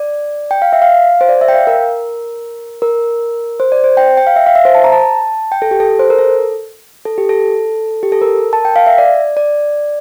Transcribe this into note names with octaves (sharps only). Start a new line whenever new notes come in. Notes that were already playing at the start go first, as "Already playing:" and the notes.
Already playing: D5
G5
F5
E5
F5
C5
D5
E5
G5
F5
A#4
A#4
C5
D5
C5
G5
G5
F5
E5
F5
E5
C5
A5
A#5
A5
G5
A4
G4
A4
C5
A#4
A4
A4
G4
A4
G4
A4
A#4
A5
G5
F5
E5
D5
D5